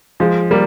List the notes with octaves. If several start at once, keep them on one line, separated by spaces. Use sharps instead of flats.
F3 G#3
G3 A#3